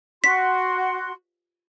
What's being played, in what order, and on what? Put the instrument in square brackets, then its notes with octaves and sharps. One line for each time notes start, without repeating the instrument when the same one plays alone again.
[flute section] F#4 C6 [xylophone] B6